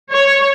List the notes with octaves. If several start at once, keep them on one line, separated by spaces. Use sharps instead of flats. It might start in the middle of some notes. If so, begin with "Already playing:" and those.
C#5